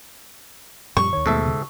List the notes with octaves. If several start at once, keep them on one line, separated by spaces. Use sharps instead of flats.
F#2 A#2 F3 G3 C#6
D#2 D#3 C#5
D#2 G#2 B2 D#3 E3 A3 A4 E5
C#3